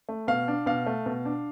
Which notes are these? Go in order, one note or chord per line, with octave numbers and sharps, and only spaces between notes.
A3
B2 F5
D4
B2 F5
A3
B2
D4